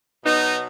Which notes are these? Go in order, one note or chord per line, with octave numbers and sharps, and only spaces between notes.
B2 F#3 B3 D#4